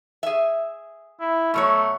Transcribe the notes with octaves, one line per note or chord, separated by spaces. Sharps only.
G#4 E5
E4
B2 F#3 A3 C#5